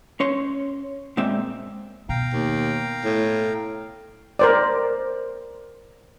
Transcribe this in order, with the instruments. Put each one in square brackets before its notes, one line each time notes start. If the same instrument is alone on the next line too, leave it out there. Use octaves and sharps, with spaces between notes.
[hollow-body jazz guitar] C#4 C#5 C6
A#2 G#3 C4 D5 E5 G5
[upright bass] B2 [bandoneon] F5 G5 A#5
[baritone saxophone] D#2
A2
[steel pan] A#4 C5 D5